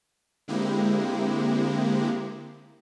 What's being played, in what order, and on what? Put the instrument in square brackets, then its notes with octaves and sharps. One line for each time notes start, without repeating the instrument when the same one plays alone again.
[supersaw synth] D3 G#3 A#3 C4 E4 G4